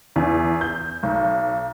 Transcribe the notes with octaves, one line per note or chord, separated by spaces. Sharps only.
E2
G6
B1